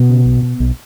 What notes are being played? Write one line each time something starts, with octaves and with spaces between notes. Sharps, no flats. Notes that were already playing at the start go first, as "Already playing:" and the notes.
Already playing: B2 B3
C#3
B1
B2
B1